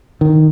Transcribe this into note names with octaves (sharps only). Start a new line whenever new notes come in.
D#3